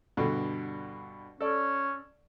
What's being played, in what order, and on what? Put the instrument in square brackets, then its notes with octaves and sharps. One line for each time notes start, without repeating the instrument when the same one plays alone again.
[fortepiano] G2 B2 D3
[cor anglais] C#4 [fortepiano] A4 D5